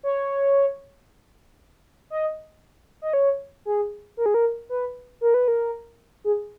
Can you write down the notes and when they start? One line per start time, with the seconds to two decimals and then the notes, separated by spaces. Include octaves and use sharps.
0.03 C#5
2.10 D#5
3.02 D#5
3.13 C#5
3.65 G#4
4.17 A#4
4.26 G#4
4.34 A#4
4.69 B4
5.21 A#4
5.34 B4
5.48 A#4
6.24 G#4